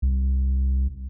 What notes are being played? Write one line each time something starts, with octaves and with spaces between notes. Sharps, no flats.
C2